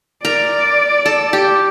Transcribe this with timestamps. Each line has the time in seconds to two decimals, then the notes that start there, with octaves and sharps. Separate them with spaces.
0.25 A#4 D5
1.06 A4
1.33 G4